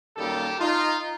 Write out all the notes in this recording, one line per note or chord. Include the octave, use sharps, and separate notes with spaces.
F#2 D#3 G3 A#3 G4 A4
D#4 F4